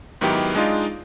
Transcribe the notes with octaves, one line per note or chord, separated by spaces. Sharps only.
G#2 D#3 F#3 B3 E4 G4
G#3 D4 D#4 F4